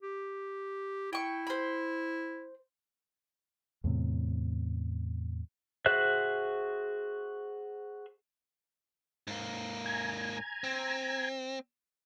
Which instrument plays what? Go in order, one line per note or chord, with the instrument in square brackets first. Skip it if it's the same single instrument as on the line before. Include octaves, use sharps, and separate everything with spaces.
[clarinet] G4
[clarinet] E4 [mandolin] G5 C#6
[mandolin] C5 B5
[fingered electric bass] E2 A2 C3
[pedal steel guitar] F#4 G#4 C5 E5 F#6
[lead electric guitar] G#2 A#3
[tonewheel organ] G#5 A#5 G#6
[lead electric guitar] C4